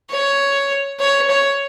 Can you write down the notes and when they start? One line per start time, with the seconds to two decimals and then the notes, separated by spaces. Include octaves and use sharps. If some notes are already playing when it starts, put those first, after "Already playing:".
0.10 C#5
1.00 C#5
1.30 C#5